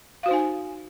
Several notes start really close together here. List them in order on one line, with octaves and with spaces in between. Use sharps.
F5 F#4 C5 D#4 G#5